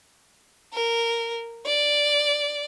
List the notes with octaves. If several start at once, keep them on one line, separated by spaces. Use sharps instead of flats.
A#4
D5